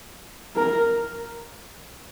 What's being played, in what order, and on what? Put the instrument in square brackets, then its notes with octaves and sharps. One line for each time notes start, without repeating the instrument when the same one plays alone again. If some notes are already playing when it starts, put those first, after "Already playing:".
[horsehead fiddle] A#4